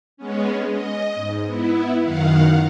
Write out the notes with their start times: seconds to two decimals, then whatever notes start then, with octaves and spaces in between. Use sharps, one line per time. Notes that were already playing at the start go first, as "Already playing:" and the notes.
0.17 G#3 B3 C#4
0.70 D#5
1.15 G#2
1.46 B3 E4
2.01 F#2 D#3 F5 F#5